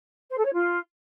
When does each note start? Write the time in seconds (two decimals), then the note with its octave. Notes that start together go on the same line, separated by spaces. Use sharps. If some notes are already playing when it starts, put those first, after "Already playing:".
0.31 C5
0.38 A4
0.46 C#5
0.53 F4